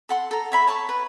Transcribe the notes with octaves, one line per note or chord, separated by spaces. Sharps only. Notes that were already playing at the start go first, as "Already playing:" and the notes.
A4 F#5 C6
A4 A#5
C#5 E5 B5
C#5 A5 B5 C#6
B4